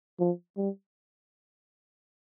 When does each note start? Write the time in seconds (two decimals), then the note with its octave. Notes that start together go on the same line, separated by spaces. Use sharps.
0.19 F3
0.57 G3